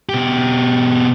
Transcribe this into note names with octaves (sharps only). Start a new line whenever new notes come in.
B2 G4